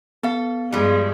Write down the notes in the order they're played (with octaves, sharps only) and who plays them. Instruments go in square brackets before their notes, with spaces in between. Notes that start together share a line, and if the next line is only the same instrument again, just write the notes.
[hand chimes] B3 F5 [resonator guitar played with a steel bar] A4
[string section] G2 G#3 [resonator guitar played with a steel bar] F3 G3